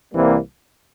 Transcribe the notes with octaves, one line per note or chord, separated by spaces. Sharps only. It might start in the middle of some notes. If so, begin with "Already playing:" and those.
C2 C3 E3 G3 A#3